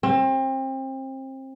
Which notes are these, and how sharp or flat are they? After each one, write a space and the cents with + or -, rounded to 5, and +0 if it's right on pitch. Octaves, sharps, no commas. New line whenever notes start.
C4 +30